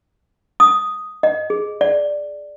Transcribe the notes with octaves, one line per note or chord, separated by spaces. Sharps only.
D#6
D#5
G#4
D5